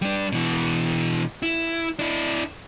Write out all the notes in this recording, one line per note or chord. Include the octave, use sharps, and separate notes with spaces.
G3 D4
B2 E3
E4
D4 E4